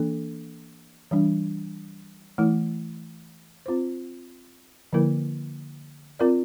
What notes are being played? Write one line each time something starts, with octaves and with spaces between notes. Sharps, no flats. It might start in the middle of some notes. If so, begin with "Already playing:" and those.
Already playing: E3 A#3 D4 A4
E3 G3 D4
E3 A3 E4
C4 F4 C5
D3 F3 A#3 E4 A#4
C4 F4 A#4 D5